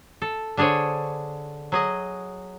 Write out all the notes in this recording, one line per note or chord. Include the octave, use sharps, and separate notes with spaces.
A4
D3 D4 G#4 C5 C#5
F#3 G#4 D#5